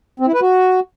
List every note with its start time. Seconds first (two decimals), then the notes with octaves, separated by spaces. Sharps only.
0.20 C4
0.27 E4
0.34 B4
0.41 F#4